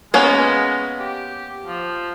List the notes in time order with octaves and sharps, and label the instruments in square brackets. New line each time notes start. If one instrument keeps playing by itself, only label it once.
[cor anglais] G#3 [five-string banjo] A#3 B3 C#4
[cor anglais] G4
F3